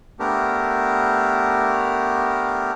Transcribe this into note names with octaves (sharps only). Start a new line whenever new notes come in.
A3 B3 D4 G4 A#4